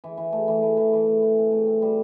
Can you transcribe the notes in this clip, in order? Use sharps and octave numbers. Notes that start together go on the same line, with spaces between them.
E3
E3
A3
E3
A3
E3
E3
A3
E3
C4
A3
C4
G3